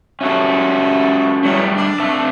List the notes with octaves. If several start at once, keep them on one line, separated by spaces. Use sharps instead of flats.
G3 A3 C#4 F#4 A4 E5
E2 F#3 G3 A3
D4
C3 E5 A5